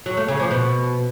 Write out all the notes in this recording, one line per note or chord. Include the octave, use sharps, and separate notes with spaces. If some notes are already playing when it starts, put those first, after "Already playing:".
F#3
A3
C#3
F3
B2